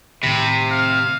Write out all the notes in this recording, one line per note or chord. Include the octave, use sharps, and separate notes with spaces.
A2 C3 D#3 C4 B5
F5